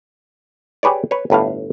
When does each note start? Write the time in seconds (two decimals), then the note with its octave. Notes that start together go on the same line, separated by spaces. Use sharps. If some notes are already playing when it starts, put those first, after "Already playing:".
0.83 G4 G#4 B4 C#5 D5
1.11 B4 C#5
1.30 G1 A2 B4 F5